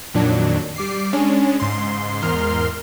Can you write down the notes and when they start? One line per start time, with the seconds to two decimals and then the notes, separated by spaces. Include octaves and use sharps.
0.14 F2 A#2 D#3 F#3 D4
0.76 G3 D6 C7
1.13 G#3 C#4 D4
1.60 G#2 C#3 C6
2.22 E2 G#2 A#4 C6 F6